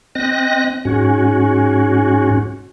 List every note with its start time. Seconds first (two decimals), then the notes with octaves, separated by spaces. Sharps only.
0.15 C4 D#5 F#6 A#6
0.85 G#2 C#4 F#4